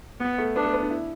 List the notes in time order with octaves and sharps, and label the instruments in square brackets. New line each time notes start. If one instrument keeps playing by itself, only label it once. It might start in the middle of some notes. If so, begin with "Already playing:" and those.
[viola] B3
[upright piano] A3
[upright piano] B3 [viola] D4
[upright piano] A3
B3
D4
E4